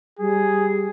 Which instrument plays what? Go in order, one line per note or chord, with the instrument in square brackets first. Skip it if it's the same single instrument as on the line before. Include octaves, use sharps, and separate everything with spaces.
[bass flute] G3 [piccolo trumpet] G#4